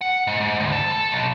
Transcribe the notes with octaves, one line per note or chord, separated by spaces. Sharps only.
F#5
G#2
G#2
D2
A4
A4
B1